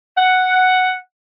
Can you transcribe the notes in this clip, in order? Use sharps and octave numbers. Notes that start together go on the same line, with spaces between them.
F#5